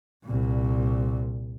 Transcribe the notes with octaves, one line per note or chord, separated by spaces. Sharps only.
C2 A#2